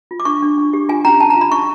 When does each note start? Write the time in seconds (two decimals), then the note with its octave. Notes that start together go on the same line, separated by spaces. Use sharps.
0.11 F4
0.20 D6
0.25 D4 C#6
0.42 D4
0.58 D4
0.73 G4
0.89 F4 G#5
1.05 C#4 A#5
1.20 C#4 A5
1.30 A#5
1.35 F4
1.41 B5
1.52 D#4 C#6